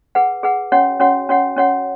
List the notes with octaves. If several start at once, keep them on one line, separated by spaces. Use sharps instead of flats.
G#4 B4 F#5
G#4 B4 F#5
C#4 F#4 C#5 F#5
C#4 F#4 C#5 F#5
C#4 F#4 C#5 F#5
C#4 F#4 C#5 F#5